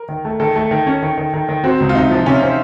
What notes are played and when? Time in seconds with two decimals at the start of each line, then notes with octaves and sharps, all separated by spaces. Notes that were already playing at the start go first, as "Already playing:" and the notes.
Already playing: A#4
0.09 D#3
0.25 A3
0.40 D#3 A4
0.56 A3
0.71 D#3
0.87 C#4
1.02 D#3
1.18 D#3
1.34 D#3
1.49 D#3
1.64 C4 F#4
1.80 C#2
1.89 F4
1.95 C3 D#4
2.11 F3
2.26 C3 C#4
2.42 C4
2.47 D#4